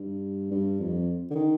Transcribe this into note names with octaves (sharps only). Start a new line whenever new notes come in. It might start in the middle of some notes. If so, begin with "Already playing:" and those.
Already playing: G2
G2
F2
D3
D#3